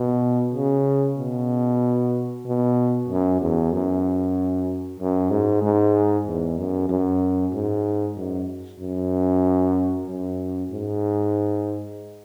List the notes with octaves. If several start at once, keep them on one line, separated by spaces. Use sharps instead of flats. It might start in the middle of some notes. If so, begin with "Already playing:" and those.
Already playing: B2
C#3
B2
B2
F#2
E2
F#2
F#2
G#2
G#2
E2
F#2
F#2
G#2
F#2
F#2
F#2
G#2